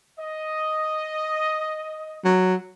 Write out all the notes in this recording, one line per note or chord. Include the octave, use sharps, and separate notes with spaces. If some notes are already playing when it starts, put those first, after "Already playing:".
D#5
F#3